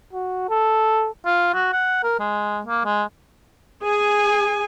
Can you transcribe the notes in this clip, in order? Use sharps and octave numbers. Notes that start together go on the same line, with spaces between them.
F#4
A4
F4
F#4
F#5
A#4
G#3
A#3
G#3
G#4 G#5